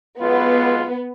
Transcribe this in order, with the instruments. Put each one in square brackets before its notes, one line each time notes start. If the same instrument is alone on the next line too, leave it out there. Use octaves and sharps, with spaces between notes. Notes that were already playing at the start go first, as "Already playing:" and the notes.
[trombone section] B1 G#3 F4 [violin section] B3